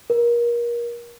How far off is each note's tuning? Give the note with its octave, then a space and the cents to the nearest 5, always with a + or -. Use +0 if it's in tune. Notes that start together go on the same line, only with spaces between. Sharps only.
A#4 +30